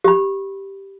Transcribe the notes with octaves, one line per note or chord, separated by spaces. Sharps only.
G4 B5